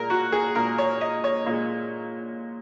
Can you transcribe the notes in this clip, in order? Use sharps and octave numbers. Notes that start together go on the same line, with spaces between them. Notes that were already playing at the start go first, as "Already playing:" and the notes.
Already playing: A#2 G#3 A#4
F#4
G#4
A#2 G#3 A#4
C#5
D#5
C#5
A#2 G#3